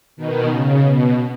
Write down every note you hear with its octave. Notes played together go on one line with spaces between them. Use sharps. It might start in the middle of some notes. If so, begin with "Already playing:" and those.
B2 D#3
C#3
B2